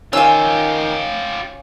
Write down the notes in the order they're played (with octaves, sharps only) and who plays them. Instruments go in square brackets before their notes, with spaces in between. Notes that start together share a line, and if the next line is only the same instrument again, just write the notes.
[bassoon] D#3 [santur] C#4 F5 [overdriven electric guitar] F4 G4 [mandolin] G#5 E6